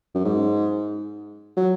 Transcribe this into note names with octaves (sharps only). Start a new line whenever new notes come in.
F#2
G#2
F#3